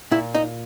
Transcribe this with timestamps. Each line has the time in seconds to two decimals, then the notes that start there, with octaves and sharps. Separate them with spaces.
0.11 A#2 E4
0.34 D#4